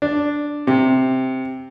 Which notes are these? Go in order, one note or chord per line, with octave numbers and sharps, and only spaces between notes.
D4
C3